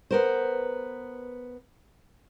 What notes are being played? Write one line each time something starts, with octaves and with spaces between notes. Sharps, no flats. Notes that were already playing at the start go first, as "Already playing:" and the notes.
B3 A#4 C5